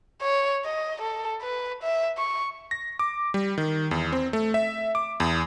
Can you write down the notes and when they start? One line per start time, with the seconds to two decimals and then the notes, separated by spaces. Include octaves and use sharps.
0.22 C#5
0.65 D#5
1.02 A4
1.42 B4
1.83 E5
2.18 C#6
2.71 A#6
2.99 D6
3.34 G3
3.58 D#3
3.91 E2
4.12 C4
4.33 A3
4.54 E5
4.95 D6
5.20 E2